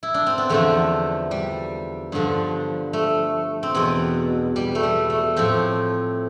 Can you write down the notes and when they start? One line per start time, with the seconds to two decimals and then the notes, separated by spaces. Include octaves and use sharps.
0.03 E4
0.14 D4
0.26 C4
0.38 B3
0.49 E2 D3 F3 A3
1.31 G3
2.12 G2 D3 F3
2.93 A3
3.63 C4
3.75 E2 B2 B3
4.56 G3
4.75 A3
4.83 G3
5.10 A3
5.36 A2 F3 C4